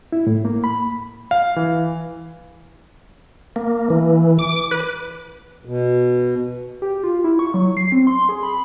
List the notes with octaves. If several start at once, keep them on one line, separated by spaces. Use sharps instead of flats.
E4
A2
A#3
B5
F5
E3
A#3
E3
D6
B4
B2
G4
F4
E4
C#6
F#3
C7
C4
C6
G#4
B5